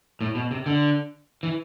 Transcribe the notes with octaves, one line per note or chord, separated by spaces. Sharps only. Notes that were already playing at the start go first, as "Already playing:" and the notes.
A2
B2
C3
D3
E3